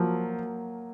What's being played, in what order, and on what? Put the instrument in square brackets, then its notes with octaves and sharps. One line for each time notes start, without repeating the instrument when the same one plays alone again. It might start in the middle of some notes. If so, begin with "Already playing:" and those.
Already playing: [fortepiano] F3 [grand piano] F#3 A#3